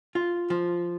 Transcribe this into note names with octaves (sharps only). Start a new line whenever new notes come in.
F4
F3